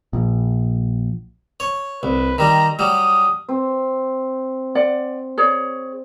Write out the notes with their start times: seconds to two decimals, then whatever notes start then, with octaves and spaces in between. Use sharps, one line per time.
0.13 A#1
1.60 C#5
2.03 C2 B4
2.38 D#3 G3 A#5
2.79 F#3 G3 D#6
3.49 C4
4.75 D5 F#5
5.38 G#4 C#5 D5